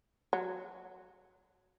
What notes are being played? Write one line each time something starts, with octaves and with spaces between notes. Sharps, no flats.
F#3